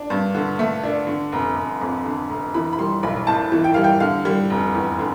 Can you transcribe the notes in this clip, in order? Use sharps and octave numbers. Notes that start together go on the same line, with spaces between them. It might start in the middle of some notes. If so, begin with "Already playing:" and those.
Already playing: D4
G2
D3
A3
D4
D3
F1
F1
F2
D3
F1
E3 B5
B5
G3 C6
B1 B5
A2 A5
E3
G5
G3 F5
G5
D3 F5
G3
F1
E2
D3